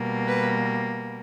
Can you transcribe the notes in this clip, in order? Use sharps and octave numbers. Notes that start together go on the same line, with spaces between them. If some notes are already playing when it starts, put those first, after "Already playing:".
Already playing: B2 G3 A#3
B4